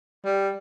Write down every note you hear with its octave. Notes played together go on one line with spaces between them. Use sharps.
G3